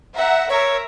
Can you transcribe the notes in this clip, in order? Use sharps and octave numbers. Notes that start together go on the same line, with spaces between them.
E5 F#5 A#5
A#4 C#5 E5